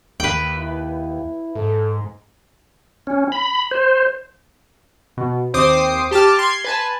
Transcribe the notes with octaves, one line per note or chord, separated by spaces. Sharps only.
D#2 B4 G5
E4
G#2 A4
C#4
B5
C5
B2
D#2 C4 C5 D6 D#6 C7
G4 A5 D6 F6
C6 G#6
B4 G#5 A5